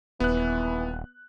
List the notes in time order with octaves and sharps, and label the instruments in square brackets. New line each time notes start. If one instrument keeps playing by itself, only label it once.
[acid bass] D#1 [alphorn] E3 [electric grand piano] B3 F#6